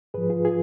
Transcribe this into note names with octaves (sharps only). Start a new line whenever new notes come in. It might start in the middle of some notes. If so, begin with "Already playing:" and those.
G#2 F3 G#4 B4
F4 G#4
F4 G#4